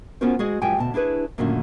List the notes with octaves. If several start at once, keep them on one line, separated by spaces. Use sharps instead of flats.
B3 C#4 F4 F#4 A#4 C5
G#3 F#4 G#4 D#5
F#2 F3 G#3 G4 G5 G#5
D2 B2 A5
D4 E4 G#4 B4 C#5
F#2 A#2 D3 D#3 A3 C#4